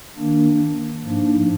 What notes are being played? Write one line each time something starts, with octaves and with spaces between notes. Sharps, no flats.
D#3 A#3 D4
G#2 F3 A#3 D4